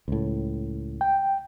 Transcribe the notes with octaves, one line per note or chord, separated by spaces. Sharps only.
C#2 A2
G5